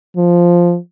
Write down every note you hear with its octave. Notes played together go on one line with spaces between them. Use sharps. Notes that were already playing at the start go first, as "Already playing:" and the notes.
F3